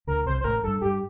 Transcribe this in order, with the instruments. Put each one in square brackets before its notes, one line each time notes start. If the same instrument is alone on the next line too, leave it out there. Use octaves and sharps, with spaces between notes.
[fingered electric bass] D2 D3 [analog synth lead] A#4
[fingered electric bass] C2 C3 [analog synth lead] C5
[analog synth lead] C5
[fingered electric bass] A1 A2 [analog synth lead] A#4
[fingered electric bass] G2 [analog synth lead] A4
[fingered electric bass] G2 [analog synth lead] G4